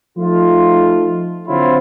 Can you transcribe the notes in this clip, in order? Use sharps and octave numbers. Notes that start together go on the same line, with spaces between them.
F3 A3 D#4 F4
D3 F#3 C4 E4 F4